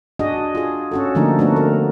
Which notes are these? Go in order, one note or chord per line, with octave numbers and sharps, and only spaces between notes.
D4 F#4 G#4 D#5
F4 G#4
C#4 F#4 A4
D3 F3 A3 A#3 D4 D#4
A3 B3 D4 F#4
A#4